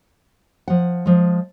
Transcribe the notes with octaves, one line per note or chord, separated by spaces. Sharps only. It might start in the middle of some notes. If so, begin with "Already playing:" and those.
F3 F#5
F3 G#3